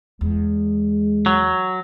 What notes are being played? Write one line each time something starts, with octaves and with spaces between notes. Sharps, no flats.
E2 G#3
F#3